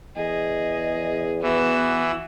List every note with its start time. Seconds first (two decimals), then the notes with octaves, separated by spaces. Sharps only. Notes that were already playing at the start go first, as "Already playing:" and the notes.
0.16 E2 G#4 D#5
1.42 E3 B3 F#4 E6